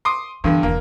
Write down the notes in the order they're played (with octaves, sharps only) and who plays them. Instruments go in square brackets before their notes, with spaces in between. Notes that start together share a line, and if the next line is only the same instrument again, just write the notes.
[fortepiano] C6 D6 D#6
[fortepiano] G2 D3 [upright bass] E3 B3
[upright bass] E1 E3 [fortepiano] A#3